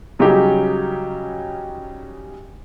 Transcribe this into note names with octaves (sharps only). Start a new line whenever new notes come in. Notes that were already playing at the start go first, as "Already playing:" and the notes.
C#3 F#3 G3 C#4 D#4 G4